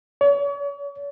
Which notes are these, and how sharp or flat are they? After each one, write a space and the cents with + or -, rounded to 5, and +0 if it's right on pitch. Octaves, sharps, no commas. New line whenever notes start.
C#5 +40